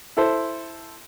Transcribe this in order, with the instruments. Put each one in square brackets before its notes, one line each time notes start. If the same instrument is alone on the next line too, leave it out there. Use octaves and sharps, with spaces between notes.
[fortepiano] E4 A4 C5